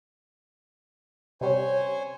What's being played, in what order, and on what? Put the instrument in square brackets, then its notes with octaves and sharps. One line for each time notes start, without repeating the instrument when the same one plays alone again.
[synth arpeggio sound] C3 G3 C#4 [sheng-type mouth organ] C5 C#5 G#5